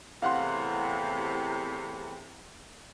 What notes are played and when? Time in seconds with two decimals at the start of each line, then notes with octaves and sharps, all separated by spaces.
0.22 E2 A2 C3 F5 F#5 C6